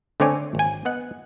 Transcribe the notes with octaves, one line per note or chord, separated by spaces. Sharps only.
D3 A3 C4 C#5 D5 G#5
G#1 G#5
B3 D#5 F#5